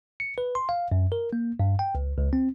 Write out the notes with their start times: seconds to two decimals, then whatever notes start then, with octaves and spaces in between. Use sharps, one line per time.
0.20 C#7
0.38 B4
0.55 C6
0.69 F5
0.92 F#2
1.12 A#4
1.33 A#3
1.60 G2
1.79 G5
1.95 C#2
2.18 C#2
2.33 C4